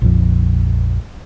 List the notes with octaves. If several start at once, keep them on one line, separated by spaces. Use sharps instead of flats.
A#1 F2